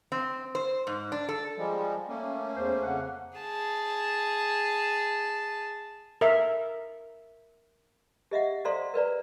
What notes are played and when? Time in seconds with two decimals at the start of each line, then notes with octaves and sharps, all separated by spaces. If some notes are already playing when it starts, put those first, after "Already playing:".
0.12 C4
0.55 C5
0.87 G#2
1.12 D4
1.29 A4
1.57 F3 G3 G#3
2.09 A3 A#3 C#4
2.57 E2 C5
2.82 F2 C#3 F#5
3.39 G#4 A5
6.21 A#4 E5
8.31 G4 D#5 E5 F#5
8.65 A4 C5 D5 F5 A#5 C6
8.94 A#4 B4 D5 A#5